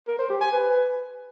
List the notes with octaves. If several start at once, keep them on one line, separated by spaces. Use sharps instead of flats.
A#4
C5
G4
G#5
B4